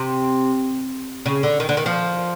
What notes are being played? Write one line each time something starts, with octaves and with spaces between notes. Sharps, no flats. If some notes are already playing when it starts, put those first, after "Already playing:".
Already playing: C3
C#3
D3
D#3
D3
D#3
F3